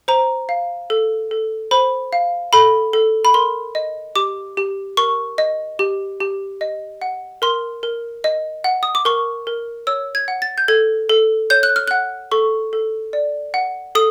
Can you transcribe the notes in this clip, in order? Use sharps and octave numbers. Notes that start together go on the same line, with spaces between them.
C5 A#5
F5
A4
A4
C5 B5
F5
A4 B5
A4
B5
A#4 C6
D#5
G4 D6
G4
A#4 C#6
D#5
G4
G4
D#5
F#5
A#4 C6
A#4
D#5
F#5
D#6
D6
A#4 C#6
A#4
C#5 E6
G#6
F#5
A6
G6
A4 G#6
A4
C#5 G6
F#6
F6
F#5 F#6
A4 C#6
A4
D5
F#5
A4 D#6